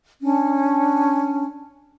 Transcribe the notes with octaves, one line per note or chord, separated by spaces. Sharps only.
C#4 D4